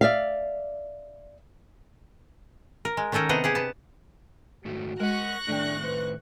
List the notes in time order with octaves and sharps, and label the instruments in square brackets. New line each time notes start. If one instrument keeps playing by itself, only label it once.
[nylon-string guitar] D5 E5 F5
[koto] A#4
G#3
D#3 C#4 D#4 A4 A#4
C3 B3 D4 D#5 F#5 A#5
G4 G#4 F#5
B3 A5
[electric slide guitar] G#2 D#3 A3 [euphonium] F#4
[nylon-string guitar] G#3 [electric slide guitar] A#4 F#5 [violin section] C#6 F#6 A#6
[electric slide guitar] A2 D#3 [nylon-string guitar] A3 G5 [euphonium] D4
[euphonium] B4 [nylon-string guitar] C5